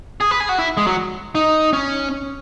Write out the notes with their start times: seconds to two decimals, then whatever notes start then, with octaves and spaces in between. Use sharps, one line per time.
0.21 G#4
0.31 B4
0.40 G#4
0.49 F#4
0.59 E4
0.77 G#3
0.87 F#3
1.35 D#4
1.73 C#4